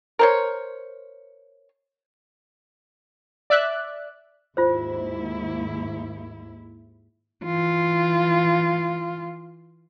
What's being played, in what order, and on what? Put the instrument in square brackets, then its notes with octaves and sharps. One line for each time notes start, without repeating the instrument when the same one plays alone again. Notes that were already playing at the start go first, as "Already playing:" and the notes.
[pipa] A#4 C5 C#5
[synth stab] D5 E5 F#6
[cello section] D#2 G#2 E4 [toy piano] F4 C5
[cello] E3 F4